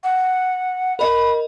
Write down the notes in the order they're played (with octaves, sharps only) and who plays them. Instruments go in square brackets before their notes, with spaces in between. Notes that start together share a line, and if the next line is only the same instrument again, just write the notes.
[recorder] F#5
[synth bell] A#4 D#5 [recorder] B5